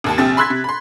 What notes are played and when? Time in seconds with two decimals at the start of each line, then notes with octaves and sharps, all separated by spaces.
0.04 G#1 D#2 A5
0.18 A#1 C3 C4 A6
0.37 B5 C6 E6 F#6 G#6 B6
0.50 C3
0.64 B5 C6